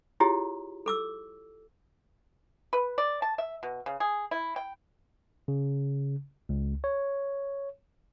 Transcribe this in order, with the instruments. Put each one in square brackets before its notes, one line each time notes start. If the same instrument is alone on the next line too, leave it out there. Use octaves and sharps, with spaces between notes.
[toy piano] E4 F4 G4 G#4 C#5
A4 D6 E6
[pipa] B4
D5
A5
E5
B2
C#3
G#4
E4
G5
[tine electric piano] C#3
C#2
C#5